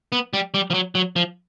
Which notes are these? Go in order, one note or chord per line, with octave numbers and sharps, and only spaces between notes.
B3
G3
G3
F3
F#3
F#3
F3